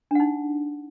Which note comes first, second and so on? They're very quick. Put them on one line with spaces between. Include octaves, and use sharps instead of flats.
D4 F#5 D#4